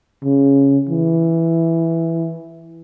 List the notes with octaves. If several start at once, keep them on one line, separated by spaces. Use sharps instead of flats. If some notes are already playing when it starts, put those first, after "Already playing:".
C#3
E3